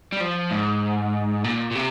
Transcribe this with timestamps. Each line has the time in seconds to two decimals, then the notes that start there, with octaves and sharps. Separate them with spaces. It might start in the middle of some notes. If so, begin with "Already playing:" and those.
0.12 G3
0.20 F3
0.51 G#2
1.44 A#2
1.71 A#2
1.75 C3